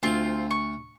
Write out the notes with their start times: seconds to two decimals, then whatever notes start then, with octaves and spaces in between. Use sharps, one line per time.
0.03 D2 C4 F4 G#5
0.51 C#6